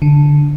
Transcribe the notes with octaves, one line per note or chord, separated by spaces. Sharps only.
D3